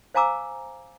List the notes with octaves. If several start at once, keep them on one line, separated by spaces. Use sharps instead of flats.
C5 F5 G#5 A#5 D6 E6